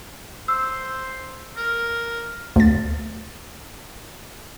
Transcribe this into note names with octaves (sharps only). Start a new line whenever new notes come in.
C5 E6
A#4
D2 A6